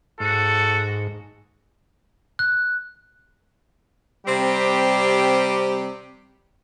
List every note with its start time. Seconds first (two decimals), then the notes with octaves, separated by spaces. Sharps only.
0.20 G#2 F#4 A4
2.39 F#6
4.26 C3 G3 C4 G4